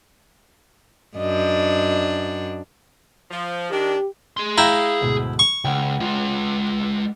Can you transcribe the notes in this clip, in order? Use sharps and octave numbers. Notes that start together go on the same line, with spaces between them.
F#2 D4 D#5
F3
D#3 D4 G4
G#4 C6
E4 F5 G5 A#5
D2 G#2 B2
C#6
C#2 F#5 G5
G#3 F4